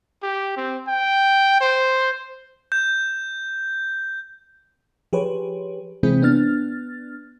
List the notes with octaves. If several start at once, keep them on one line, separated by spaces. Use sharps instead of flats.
G4
C4
G5
C5
G6
F3 G4 G#4 B4 C#5
C3 E3 G#3 C4 E4 G#4
B3 D4 F6 A6